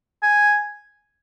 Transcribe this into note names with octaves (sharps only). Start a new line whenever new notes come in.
G#5